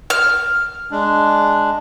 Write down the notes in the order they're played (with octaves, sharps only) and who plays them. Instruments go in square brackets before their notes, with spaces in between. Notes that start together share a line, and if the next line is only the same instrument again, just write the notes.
[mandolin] F6
[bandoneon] G#3 D4